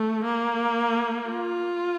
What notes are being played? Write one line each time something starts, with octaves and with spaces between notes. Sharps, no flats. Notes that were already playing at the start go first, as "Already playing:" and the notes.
Already playing: A3
A#3
F4